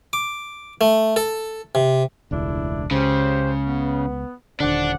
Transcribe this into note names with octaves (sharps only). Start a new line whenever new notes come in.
D6
A3
A4
C3
E1 C#2 A3 D4 E4
C#2 C#3 C#4 G4 C5
B3
D#1 D3 D4 C5 D5 F#5